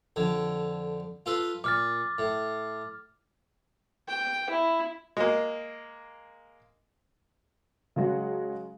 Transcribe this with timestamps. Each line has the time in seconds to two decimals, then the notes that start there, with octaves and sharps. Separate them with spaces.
0.16 F2 D3
1.26 F4 A4 B4
1.64 A#2 D6 F6 A6
2.18 A2
4.08 G5
4.50 E4
5.17 G#3 A#3
7.96 C#3 F#3 G#3 F#4